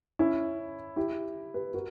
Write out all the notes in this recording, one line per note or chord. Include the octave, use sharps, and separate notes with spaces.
C#4 E4
E4 G4
G4 B4
F#4 A#4